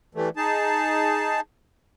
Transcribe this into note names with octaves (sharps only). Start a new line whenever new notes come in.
E3 G3 A3
D#4 G#4 A5